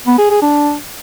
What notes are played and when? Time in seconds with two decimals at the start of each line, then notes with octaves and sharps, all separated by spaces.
0.06 B3
0.18 G#4
0.30 G#4
0.42 D4